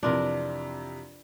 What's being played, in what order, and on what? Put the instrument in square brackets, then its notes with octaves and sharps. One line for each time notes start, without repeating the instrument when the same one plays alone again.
[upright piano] F2 C3 E3 [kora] D4 F4 A#4